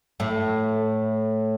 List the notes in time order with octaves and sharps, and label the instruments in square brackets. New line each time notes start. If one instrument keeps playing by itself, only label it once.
[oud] A2 A3